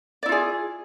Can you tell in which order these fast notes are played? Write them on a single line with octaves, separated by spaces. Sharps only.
D5 E4 F4 G#4